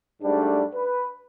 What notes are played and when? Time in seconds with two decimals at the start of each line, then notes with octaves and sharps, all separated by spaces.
0.22 G#2 G3 A3 D4
0.74 B4